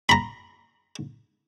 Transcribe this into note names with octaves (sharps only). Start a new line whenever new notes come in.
A#5 B5